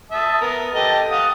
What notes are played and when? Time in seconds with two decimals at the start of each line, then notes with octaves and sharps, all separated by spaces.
0.11 E5 A5 D#6
0.41 B3 A#4
0.74 G4 A4 D#5
1.11 F5 F#5 D#6